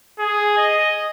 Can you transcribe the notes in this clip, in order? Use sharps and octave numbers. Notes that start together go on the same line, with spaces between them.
G#4
D#5